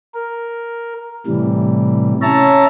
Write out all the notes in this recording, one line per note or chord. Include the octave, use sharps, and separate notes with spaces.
A#4
A2 C3 E3 G3
C#4 C#5 E5 A5 A#5